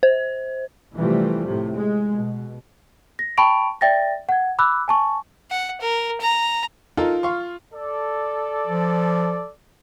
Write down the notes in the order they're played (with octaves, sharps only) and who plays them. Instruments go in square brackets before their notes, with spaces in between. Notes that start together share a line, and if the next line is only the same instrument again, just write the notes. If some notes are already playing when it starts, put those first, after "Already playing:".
[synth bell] C5
[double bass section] C3 E3 F3 G3 A3
A2 C3
G#3
B2
[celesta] A#6
G5 A5 B5 C#6 D7 F7
D5 E5 G5 A6 A#6
F#5 G#6
B5 D6 E6 F#6
G#5 A5 C#6
[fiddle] F#5
A#4
A#5
[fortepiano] D#4 A4 A#4 [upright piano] F4
[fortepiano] F5 C6 C#6
[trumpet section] A4 D5
[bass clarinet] F3